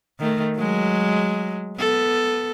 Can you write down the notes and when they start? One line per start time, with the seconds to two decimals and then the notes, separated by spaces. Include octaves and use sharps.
0.20 D#3 A3
0.56 F#3 G#3
1.78 B3 A4